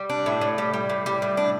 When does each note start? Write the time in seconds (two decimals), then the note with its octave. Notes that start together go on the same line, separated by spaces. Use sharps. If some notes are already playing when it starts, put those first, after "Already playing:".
Already playing: G3
0.10 D4
0.26 A2
0.41 A2
0.58 G3
0.74 G3
0.89 A2
1.06 G3
1.22 A2
1.37 D4